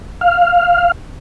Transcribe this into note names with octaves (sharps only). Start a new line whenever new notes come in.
F5